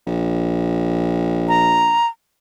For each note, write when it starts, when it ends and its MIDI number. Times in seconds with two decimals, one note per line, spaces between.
0.07 2.00 34
1.48 2.07 82